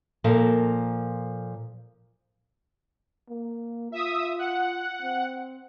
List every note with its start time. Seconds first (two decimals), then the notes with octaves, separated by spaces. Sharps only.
0.24 A#2 F3 A4 A#4
3.29 A#3
3.92 F4 E5 D#6
4.39 F#5
5.02 C4